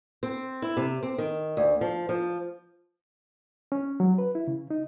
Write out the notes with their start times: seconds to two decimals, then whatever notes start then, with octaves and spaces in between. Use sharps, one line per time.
0.23 C4
0.62 E4
0.77 C3
1.03 C4
1.18 D#3
1.57 D2
1.81 F3
2.09 F3
3.72 C#4
4.00 F#3
4.18 B4
4.35 E4
4.47 C#3
4.70 D#4